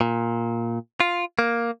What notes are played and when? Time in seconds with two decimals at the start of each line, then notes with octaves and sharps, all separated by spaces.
0.01 A#2
1.00 F4
1.39 A#3